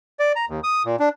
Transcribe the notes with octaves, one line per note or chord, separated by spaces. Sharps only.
D5
A#5
D#2
D#6
A#2
D4